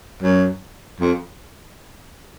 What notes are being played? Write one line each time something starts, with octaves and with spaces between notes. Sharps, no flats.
F#2
F2